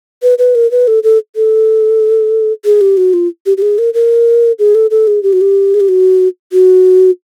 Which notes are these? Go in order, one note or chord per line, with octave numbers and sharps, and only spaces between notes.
B4
B4
A#4
B4
A4
A4
A4
G#4
G4
F#4
F4
G4
G4
G#4
A#4
A#4
G#4
A4
A4
G#4
G4
F#4
G4
G#4
G4
F#4
F#4